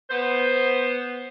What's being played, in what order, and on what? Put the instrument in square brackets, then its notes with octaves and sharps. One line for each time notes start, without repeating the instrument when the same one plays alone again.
[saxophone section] B3 C5